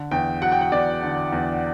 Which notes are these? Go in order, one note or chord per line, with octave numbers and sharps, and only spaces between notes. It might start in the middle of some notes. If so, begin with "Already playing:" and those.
Already playing: D3
E2 G5
F#3 F#5
G5
F#5
E2 D5
D3
E2